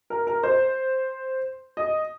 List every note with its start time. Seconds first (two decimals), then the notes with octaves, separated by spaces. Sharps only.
0.10 A#4
0.27 A#4
0.43 C5
1.77 D#5